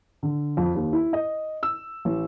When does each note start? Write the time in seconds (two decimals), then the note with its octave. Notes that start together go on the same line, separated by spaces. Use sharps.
0.23 D3
0.57 F2
0.75 D#2
0.93 E4
1.13 D#5
1.63 E6
2.05 A1